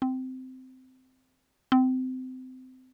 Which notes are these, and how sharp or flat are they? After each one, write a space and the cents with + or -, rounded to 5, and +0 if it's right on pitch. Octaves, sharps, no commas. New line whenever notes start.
C4 -15
C4 -25